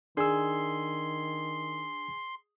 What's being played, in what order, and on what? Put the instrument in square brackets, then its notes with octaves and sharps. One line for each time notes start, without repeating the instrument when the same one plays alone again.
[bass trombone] D#3 [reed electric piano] D4 E6 [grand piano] G#4 [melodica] C6